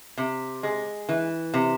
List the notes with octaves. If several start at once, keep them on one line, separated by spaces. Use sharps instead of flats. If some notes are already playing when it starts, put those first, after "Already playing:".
C3
G#3
E3
C3